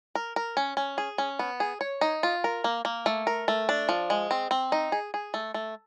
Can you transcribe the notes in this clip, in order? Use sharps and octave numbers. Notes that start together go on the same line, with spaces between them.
A#4
A#4
C#4
C#4
G#4
C#4
B3
G#4
C#5
D#4
F4
A#4
A#3
A#3
A3
A#4
A3
D4
F3
G#3
C4
C4
D#4
G#4
G#4
A3
A3